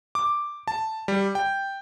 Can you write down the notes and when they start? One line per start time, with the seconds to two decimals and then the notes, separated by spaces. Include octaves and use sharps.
0.15 D6
0.68 A5
1.08 G3
1.35 G5